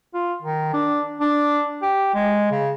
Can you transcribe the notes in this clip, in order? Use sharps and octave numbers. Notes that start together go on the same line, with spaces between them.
F4
D#3
D4
D4
G4
G#3
C#3